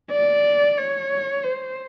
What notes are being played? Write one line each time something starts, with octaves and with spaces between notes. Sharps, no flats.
D5
C#5
C5